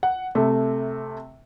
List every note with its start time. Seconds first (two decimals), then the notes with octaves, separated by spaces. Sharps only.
0.03 F#5
0.35 C3 A3